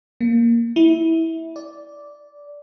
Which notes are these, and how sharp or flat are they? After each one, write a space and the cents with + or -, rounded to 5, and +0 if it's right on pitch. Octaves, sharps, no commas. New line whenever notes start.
A#3 +0
E4 -15
D5 -10